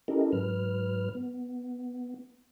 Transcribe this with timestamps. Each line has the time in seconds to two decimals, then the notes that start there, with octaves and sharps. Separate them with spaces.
0.08 C#4 E4 G4 A4 A#4 D#5
0.32 G#2 F#3 B4 F6
1.15 B3